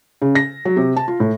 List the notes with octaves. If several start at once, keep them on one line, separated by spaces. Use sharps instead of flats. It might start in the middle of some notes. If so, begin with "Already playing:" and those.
C#3
A#6
F#3
C3
A5
F4
A2